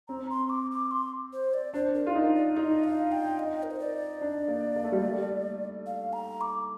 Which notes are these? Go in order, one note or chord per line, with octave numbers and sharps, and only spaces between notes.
C4 A#5
C6
D6
D6
C6
C5
D5
D4 C5
A#4
F4
D#4
D5
D#4 D#5
F5
G5
D#5
A#4
C5
D5
D4
A#3
A#3
A3
G3
A3
F5
A#5
D6